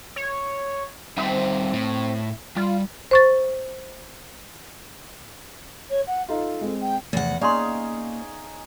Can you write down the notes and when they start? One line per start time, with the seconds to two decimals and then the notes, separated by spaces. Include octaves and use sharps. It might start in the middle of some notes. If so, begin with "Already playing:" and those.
0.16 C#5
1.17 G3 C4 D#4 E5
1.73 A2
2.56 G3 F4
3.11 C5 C#6 A6
5.90 C#5
6.07 F#5
6.29 D#4 F4 A4
6.61 G#3 C4
6.81 G5
7.13 E2 C3 F3 A3 F#5
7.41 A#3 C#4 D#4 G#4 D5 F5 C6